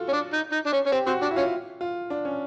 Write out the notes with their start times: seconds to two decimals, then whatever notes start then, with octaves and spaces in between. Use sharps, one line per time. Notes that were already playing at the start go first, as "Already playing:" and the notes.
Already playing: F4 F#4 A4
0.08 C#4
0.12 D4
0.33 D#4
0.52 D#4
0.66 D4
0.72 C#4
0.86 C#4
0.92 C4 G4
1.06 C4 F#4
1.21 D4 F#4
1.31 E4
1.36 C#4 F4
1.81 F4
2.10 D4
2.25 C#4